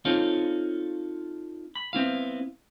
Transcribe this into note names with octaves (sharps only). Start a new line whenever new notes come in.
C4 D#4 F4 A4 C#5 F5
B5
B3 C4 E4 F5